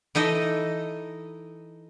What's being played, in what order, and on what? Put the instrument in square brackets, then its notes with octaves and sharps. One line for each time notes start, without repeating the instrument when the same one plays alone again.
[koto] E3 D#4 A4 D#5